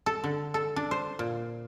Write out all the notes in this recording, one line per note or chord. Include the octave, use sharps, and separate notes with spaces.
A4
D3
A4
D4
C5
A#2